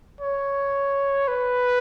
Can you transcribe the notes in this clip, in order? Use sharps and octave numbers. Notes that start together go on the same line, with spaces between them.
C#5
B4